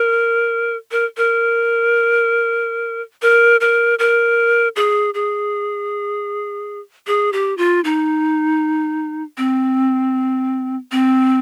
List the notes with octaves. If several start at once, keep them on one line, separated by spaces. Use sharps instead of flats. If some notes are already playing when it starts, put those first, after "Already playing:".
Already playing: A#4
A#4
A#4
A#4
A#4
A#4
G#4
G#4
G#4
G4
F4
D#4
C4
C4